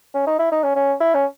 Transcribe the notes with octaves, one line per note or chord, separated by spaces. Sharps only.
C#4
D#4
E4
D#4
C#4
C#4
E4
C#4